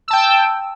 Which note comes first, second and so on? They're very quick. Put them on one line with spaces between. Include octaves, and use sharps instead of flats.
E6 A5 G5